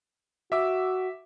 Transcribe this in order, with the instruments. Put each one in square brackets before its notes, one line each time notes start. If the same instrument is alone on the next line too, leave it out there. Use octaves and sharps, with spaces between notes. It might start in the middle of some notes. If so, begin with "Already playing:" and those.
[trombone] F#4 [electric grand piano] E5 D6 E6